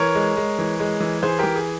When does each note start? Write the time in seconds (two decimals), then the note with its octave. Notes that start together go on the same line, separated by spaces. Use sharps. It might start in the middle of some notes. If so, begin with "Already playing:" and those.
Already playing: E3 A#4 C#5
0.15 G#3
0.37 G#3
0.59 E3
0.80 G#3
1.00 E3
1.23 E3 G#4 C5
1.39 E3 G4 A#4
1.56 G#4